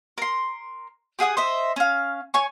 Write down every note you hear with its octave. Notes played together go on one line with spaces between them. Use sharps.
A#4 C6
G4 G#4 F#5 D#6
C5 D#5 E5
C#4 F5
C#5 G#5 C#6